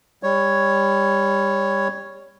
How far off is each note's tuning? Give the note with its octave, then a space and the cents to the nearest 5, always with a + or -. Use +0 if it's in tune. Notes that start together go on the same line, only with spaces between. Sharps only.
G3 +20 C#5 +0